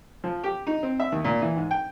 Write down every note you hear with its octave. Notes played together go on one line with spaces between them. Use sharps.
F3
G4
D#4
C4
E5
D#2
A#2
E3
G#2
G5